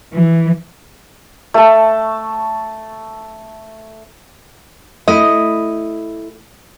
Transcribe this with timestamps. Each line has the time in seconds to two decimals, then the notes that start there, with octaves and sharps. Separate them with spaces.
0.12 E3
1.54 A3 A5
5.08 A3 E4 D#5